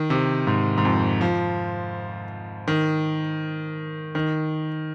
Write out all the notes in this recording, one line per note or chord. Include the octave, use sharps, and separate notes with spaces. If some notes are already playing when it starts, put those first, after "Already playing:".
Already playing: D#3
C3
G#2
G#2
F2
F3
D#3
D#3